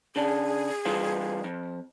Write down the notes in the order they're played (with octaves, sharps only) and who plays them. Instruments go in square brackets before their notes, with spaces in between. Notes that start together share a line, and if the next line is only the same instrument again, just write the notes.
[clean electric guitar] C#3 D4 [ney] G#4
[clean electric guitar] G2 E3 F4
F2